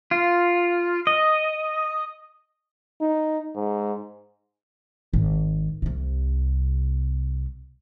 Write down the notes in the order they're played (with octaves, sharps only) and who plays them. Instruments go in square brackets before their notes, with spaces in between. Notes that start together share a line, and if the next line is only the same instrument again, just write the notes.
[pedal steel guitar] F4
D#5
[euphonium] D#4
G#2
[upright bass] G#1
C2 C3